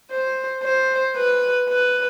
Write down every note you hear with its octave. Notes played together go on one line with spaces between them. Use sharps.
C5
C5
B4
B4